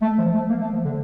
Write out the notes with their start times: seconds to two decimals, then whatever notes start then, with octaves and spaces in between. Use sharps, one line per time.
0.02 A3
0.18 F3
0.34 A3
0.49 A#3
0.61 A3
0.73 F3
0.85 D3